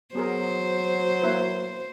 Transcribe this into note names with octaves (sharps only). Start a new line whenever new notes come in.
F#3 B3 G#4 A#4 C5
A#3 E4 B4